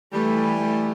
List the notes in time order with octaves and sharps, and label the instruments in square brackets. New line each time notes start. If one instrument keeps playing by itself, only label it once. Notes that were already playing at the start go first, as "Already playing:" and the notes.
[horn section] E3 G3 [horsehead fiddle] A3
[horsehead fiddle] A3